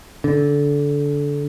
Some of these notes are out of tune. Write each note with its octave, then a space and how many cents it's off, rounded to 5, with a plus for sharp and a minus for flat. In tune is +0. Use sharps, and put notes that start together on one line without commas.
D3 -20